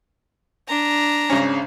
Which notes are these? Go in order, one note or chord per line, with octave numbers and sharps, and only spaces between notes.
D4 A#5
G#1 C#3 C#4